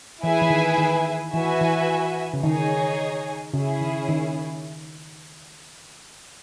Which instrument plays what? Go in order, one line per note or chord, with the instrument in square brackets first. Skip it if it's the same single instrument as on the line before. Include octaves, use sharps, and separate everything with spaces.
[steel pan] E3 [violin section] E4 G#4 B4 E5 G#5
[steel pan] E3
D#3
D#3
[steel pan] E3 [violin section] F#4 B4 E5 G#5
[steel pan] E3
C#3
[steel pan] D#3 [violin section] D#4 G#4 C#5 G#5
[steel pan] C#3 [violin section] C#4 E4 G#4
[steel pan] D#3
D#3